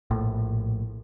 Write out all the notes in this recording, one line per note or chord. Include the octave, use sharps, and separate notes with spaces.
A#1 A2